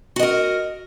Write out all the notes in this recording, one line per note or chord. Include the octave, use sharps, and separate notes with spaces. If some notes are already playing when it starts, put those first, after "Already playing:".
F#4 A#4 D#5